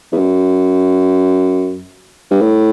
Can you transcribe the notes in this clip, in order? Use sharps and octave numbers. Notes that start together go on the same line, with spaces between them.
E2
F#2
G2
A2